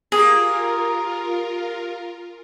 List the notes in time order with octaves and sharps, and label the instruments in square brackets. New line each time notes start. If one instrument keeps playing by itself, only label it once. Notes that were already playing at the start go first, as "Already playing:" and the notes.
[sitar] A#3 G4 [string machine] F4 A#4 [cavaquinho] G#4